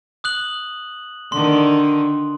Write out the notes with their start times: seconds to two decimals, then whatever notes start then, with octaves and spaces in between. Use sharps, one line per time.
0.24 D#6 F#6 F#7
1.32 D3 D#3 C6